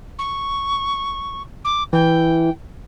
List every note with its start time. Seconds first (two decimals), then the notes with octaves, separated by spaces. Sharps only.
0.19 C#6
1.65 D6
1.93 E3 G5